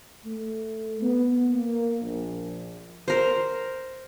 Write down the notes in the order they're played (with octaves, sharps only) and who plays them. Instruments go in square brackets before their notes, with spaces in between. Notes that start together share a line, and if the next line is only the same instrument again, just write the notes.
[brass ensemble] A3
B3
A#3
A#1
[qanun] A#4 C5